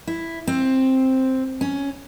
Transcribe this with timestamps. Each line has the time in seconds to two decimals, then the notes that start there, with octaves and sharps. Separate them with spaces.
0.07 E4
0.47 C4
1.61 C#4